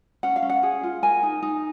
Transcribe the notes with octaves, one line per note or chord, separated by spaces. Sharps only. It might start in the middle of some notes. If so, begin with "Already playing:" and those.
C#4 F#5
F5
C#4
F#5
G#4
F4
A#4 G#5
D#4
D#4